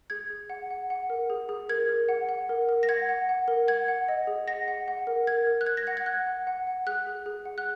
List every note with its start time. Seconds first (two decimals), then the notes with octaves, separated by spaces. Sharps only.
0.10 G#4 G#6
0.30 G#4
0.50 F#5
0.70 F#5
0.90 F#5
1.10 A#4
1.30 G#4
1.49 G#4
1.69 A#4 G#6
1.89 A#4
2.09 F#5
2.29 F#5
2.49 A#4
2.69 A#4
2.83 A#6
2.89 F#5 G#6
3.09 F#5
3.29 F#5
3.48 A#4
3.68 F#5 G#6
3.88 F#5
4.08 D#5
4.27 G#4
4.48 F#5 A#6
4.68 F#5
4.88 F#5
5.07 A#4
5.27 A#4 G#6
5.47 A#4
5.61 F#6
5.66 A#4 G#6
5.77 A#6
5.87 F#5 G#6
5.97 G#6
6.06 F#5 F#6
6.27 F#5
6.47 F#5
6.67 F#5
6.87 G#4 F#6
7.07 G#4
7.26 G#4
7.45 F#5
7.58 F#6